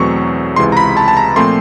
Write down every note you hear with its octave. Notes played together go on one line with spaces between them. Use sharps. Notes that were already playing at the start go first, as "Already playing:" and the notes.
Already playing: E2 B2 F#3 A3 C4 C#6
C#2 C3 E3 G#3 C6
A#5
B5
A5
A5
A#5
A#2 F3 A3 C4 C6